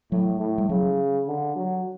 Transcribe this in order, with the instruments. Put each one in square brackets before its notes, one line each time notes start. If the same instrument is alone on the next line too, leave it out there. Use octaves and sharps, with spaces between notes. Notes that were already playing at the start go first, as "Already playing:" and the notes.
[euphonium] A2 [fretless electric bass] F#3
[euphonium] A2
[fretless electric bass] G3
[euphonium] C#3 [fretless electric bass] F#3
[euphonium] D3
F#3